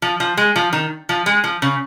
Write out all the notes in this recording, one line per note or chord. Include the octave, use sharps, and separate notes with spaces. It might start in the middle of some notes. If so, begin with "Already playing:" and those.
F3
F3
G#3
F3
D#3
F3
G#3
F3
C#3